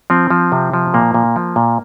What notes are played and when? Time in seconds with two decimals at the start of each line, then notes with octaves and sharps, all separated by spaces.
0.10 F3 C4
0.30 F3
0.52 C3
0.74 F3
0.94 A#2 A#3
1.14 A#2
1.36 F3
1.56 A#2